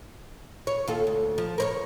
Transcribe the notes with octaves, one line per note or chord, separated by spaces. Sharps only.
C#5
D#2 F4 A4
D2
F3
A#4 C5 C#5